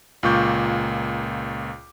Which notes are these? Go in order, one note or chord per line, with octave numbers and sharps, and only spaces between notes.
C#2 A#2 F4 C#6 D6 G6